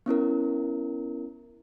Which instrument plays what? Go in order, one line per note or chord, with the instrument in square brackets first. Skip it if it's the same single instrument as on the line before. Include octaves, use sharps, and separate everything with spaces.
[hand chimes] B3 C#4 E4 A#4